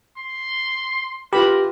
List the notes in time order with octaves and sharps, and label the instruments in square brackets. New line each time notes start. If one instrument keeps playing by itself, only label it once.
[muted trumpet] C6
[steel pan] F4 B4 B5 [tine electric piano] G4 [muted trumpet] A#4